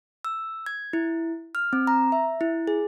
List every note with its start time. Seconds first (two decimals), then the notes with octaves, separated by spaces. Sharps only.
0.25 E6
0.66 G#6
0.93 E4
1.55 F6
1.73 C4
1.87 A#5
2.12 E5
2.41 E4
2.67 G#4